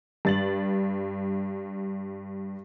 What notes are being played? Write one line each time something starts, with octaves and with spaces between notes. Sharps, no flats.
G2 A6 F#7